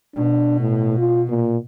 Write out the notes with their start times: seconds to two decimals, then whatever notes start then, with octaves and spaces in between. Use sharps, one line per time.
0.16 B2 D4
0.60 A2
0.98 F4
1.29 A#2